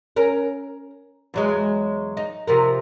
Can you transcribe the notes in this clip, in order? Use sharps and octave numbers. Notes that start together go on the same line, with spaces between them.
C#4 A#4
E2 F#3 G#3
D#4
C3 F3 A#4